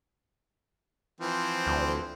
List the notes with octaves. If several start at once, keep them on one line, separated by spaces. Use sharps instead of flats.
E3 F3 C4
D2